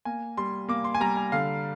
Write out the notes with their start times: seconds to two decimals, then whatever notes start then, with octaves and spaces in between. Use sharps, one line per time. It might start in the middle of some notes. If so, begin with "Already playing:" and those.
0.05 A#3 G#5
0.37 G3 C6
0.68 A#3 D6
0.84 C6
0.95 G#5
1.01 G3 A#5
1.17 G#5
1.32 D3 F5